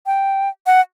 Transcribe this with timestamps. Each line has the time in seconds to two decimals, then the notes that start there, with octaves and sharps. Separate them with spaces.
0.06 G5
0.67 F#5